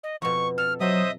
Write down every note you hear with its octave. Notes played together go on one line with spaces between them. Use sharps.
D#5
F2 B2 C#6
A4 F6
F#3 C5 D#5 E5 D#6